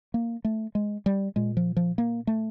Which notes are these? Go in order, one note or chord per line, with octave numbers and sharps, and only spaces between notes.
A#3
A3
G#3
G3
A#2 G#3
F3
F3
A#3
A3